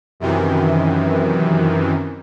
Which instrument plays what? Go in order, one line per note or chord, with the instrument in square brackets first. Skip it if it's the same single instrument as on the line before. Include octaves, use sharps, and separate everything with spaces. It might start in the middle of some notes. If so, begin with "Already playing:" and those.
[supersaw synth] F#2 C3 D#3 E3